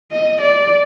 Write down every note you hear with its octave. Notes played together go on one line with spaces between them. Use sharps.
D#5
D5